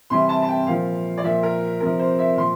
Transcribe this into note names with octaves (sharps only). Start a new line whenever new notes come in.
C3 E3 G3 C6
A5
A5
G5
A#2 F3 F5
D5
A#2 F3 E5
A#4
C3 F3 A#4
C5
E5
A#2 F3 C6